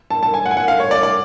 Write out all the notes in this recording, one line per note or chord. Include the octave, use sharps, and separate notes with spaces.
A5
A5
G#5
F#5
G#5
F#5
F5
C#5
D5
D5